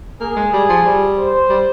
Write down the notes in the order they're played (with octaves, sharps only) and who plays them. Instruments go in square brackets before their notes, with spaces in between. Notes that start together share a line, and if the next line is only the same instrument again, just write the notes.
[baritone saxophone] A#3 [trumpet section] G#4
[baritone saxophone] G#3
G3
F3
G3
[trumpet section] C5
[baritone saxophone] G3